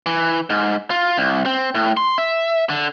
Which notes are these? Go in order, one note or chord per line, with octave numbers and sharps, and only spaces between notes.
E3
G#2
F4
C2
C4
A2
C6
E5
D3